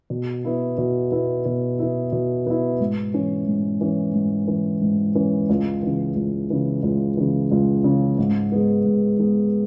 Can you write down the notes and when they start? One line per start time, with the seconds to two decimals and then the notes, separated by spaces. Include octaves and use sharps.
0.10 B2
0.45 B3 E4
0.78 B2
1.12 B3 E4
1.45 B2
1.79 B3 E4
2.12 B2
2.46 B3 E4
2.80 G#2
3.14 E3 C#4
3.47 G#2
3.81 E3 C#4
4.14 G#2
4.48 E3 C#4
4.82 G#2
5.15 E3 C#4
5.49 C#2
5.82 C#3 E3
6.16 C#2
6.50 C#3 E3
6.83 C#2
7.17 C#3 E3
7.51 C#2
7.84 C#3 E3
8.18 G#2
8.52 G#3 B3
8.85 G#2
9.19 G#3 B3